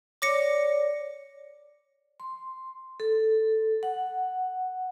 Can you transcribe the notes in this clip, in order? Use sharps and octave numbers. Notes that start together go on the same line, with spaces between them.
C#5 D5 D6 A#6 C#7
C6
A4
F#5